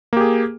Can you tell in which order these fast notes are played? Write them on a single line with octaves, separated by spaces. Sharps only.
A#3 G4 G#4